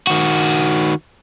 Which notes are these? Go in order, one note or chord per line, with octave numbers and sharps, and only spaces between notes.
D#3 F#4